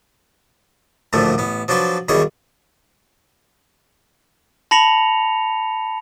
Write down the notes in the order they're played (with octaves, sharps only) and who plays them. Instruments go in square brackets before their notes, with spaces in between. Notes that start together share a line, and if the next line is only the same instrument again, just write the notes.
[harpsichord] A1 D2 A#2 D3 F3 A3
A1 B3
F3 F#3 D4 F4 B4
B1 E2 D#3 G3 G#4 C#5
[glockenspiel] A5 B5 A#6 C#7 F7